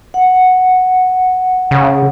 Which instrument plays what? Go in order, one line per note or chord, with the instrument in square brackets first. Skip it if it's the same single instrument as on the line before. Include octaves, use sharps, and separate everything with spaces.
[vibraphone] F#5
[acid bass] C#3